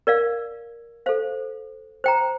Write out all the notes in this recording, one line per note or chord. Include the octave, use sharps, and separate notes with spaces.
A#4 D5 F5
A4 C5 F5
C5 G5 A#5